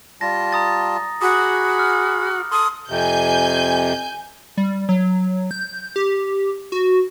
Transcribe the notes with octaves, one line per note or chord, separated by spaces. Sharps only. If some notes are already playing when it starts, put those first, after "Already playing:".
G3 F4 A5 A#6
A#5 D#6 A6
F#4 G#4 B5 D6 D#6
F6
A4 C6 D#6
F2 C3 G#5 G6
G3
F#3
G6
G4
F#4